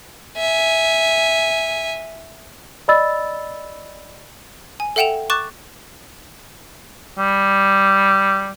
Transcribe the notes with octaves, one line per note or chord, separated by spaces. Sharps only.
E5 G#5
D5 D#5 B5 E6 A6
G#5
A4 E5 F#5 G5 E7 F7
C#6 D6 F#6 A6 E7
G3